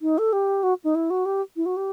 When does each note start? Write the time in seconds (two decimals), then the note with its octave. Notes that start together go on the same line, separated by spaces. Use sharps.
0.02 D#4
0.18 A4
0.33 G4
0.63 F#4
0.84 D#4
0.95 E4
1.10 F#4
1.25 G4
1.56 E4
1.66 F#4
1.77 G4